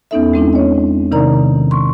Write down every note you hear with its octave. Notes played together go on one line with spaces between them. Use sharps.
E2 B3 C#4 D#4 A4 E5
G#3 C4 D4 E4
C#5 D#5
C3 D#3 D#4 A#4 D5 A#5
C6 C#6